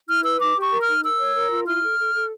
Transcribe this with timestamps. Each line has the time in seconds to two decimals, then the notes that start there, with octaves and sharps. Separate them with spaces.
0.08 E4 F6
0.23 B4 E6
0.40 D#4 D6
0.56 G4
0.61 C#6
0.72 A#4
0.82 F6
0.87 D#4
1.03 A#4 E6
1.19 C#5
1.35 A#4
1.50 F4
1.67 E4 F6
1.83 A4
1.99 A4
2.14 A4